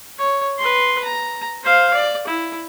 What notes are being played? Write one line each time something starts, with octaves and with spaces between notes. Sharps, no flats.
C#5
B4 C6
A#5
C5 F5
D5
E4